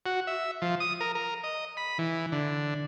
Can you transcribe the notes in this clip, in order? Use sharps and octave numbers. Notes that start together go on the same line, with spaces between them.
F#4
E5
F3
D#6
A#4
A#4
D#5
B5
E3
D3